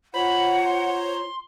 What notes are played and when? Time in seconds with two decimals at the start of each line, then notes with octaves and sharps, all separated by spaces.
0.14 F4 C5 C#5 F#5 A#5 B5
0.64 C6